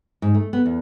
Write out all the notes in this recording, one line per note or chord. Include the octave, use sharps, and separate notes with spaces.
G#2
A3
B3
E2